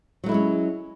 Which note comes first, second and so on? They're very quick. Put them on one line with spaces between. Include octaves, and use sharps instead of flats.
F#3 A3 E4 G#3 C#4